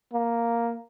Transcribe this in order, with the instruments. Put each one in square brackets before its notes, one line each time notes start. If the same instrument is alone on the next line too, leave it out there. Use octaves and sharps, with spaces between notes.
[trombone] A#3